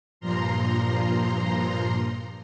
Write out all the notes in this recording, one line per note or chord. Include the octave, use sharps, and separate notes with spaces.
G2 A#2 F3 A#5 C6